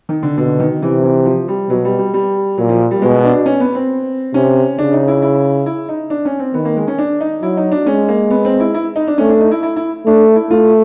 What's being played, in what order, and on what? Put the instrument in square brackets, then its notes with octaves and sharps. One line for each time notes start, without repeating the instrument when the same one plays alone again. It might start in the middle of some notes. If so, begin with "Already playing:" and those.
[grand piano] D#3
D3
[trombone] B2 [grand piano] D3
[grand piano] D#3
[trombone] C3 [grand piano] E3
[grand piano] E3
F3
G3
[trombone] B2 [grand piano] F#3
[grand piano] G3
G3
G3
[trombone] A#2 [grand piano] F#3
[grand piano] F3
G3
[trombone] B2 [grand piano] G#3
[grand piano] D4
C#4
B3
C4
[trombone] C3 [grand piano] C#4
[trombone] C#3 [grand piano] D4
[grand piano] D#4
E4
E4
E4
D#4
D4
C#4
C4
[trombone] D#3 [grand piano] B3
[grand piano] A#3
G#3
C#4
D4
D#4
[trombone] F#3 [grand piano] E4
[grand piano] D#4
D4
[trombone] G#3 [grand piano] C#4
[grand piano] A#3
B3
C4
E4
E4
D#4
D4
[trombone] A3 [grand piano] C#4
[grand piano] D4
D#4
E4
E4
E4
[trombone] A3 [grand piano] D4
[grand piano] E4
[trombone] A3 [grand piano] F4